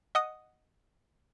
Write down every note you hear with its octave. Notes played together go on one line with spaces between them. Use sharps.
D#5 F#5 D#6